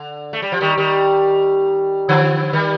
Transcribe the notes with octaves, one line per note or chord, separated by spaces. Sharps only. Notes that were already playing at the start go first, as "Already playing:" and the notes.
Already playing: D3
A3
G3
F3
D#3 G3
D#3 G3
D3 F3
D#3 G3